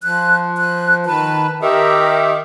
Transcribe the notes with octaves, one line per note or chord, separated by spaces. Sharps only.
F3 F#6
F#6
D#3 B4 A5
D#3 G4 A#4 E5